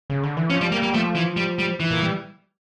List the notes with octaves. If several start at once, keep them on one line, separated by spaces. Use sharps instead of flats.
C#3
D3
E3
F3 C#4
G3
G3 A#3
A#3
F3 A3
E3
G3
G3
E3
A#2
G3